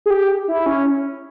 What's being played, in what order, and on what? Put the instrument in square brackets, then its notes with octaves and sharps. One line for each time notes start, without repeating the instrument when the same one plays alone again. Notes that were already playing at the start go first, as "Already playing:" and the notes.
[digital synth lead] G#4
G4
E4
C#4